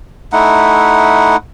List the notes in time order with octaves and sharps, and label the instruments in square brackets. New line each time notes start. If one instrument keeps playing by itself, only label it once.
[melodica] A3 D#4 E4 F#5